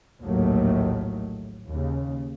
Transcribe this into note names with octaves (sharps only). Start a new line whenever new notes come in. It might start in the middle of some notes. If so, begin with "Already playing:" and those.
A#1 D#2 A2 D#3 F#3 A3
D#2 C#3